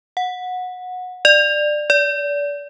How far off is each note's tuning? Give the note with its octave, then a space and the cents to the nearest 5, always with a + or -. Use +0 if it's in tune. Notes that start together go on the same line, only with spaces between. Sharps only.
F#5 -20
D5 +20
D5 -30